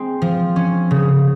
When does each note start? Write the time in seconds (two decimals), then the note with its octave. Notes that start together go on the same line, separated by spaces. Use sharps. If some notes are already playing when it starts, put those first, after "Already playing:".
Already playing: G#3 C4
0.22 F3
0.56 C#4
0.91 C#3